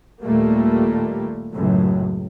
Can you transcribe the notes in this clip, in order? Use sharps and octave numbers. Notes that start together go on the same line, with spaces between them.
D#2 A#2 G3 A3 A#3
C#2 F#2 A2